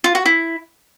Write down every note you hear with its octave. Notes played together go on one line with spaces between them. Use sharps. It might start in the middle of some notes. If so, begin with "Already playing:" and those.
F4
F#4
E4